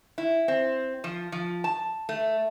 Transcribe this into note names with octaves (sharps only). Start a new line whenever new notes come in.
E4
C4
F3
F3
A5
A3